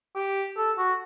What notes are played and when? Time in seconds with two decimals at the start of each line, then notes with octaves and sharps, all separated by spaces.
0.15 G4
0.57 A4
0.78 F#4